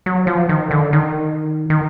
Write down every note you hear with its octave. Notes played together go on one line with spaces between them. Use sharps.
F#3
F3
D#3
D3
D#3
D#3